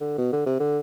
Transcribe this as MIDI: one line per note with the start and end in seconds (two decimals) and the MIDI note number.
0.01 0.15 50
0.18 0.32 47
0.32 0.45 50
0.46 0.58 48
0.60 0.80 50